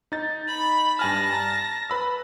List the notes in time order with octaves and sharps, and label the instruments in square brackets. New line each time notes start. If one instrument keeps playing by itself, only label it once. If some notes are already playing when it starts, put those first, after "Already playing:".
[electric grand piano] D#4 A6
[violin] B5
[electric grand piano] G2 G#5 F6 [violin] A5 A#6
[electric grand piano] A#5
B4 B5 E6